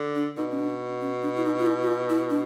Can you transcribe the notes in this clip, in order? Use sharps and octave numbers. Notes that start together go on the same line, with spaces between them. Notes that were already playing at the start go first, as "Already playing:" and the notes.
Already playing: D3
D4
B2 D#4
C#4
D4
C#4
D4
E4
D#4
F4
E4
F#4
F4
E4
D4